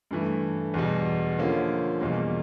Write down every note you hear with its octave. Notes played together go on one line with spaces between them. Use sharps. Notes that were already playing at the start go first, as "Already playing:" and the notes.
G2 E3 A3
E2 B2 G3
D3 F3 A#3 C#4 F4
E2 B2 G3 A#3